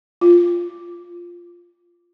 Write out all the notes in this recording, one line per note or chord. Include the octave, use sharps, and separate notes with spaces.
F4